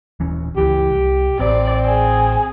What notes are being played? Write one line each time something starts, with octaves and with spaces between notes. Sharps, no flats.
D#1 E3 C#4
C#2 E3 G4
C2
A1 C4 D5
G#4